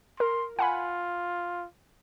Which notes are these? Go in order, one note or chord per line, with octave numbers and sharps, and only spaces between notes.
A#4 C6
F4 F#5 G#5 B5